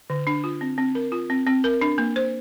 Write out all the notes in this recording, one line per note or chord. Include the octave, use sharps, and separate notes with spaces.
D3
D4
F4
C4
C4
A#4
F4
C4
C4
A#4
D4
A#3
C5